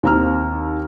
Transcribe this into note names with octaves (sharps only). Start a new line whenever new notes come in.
D#2 C4 A#5 E6 F6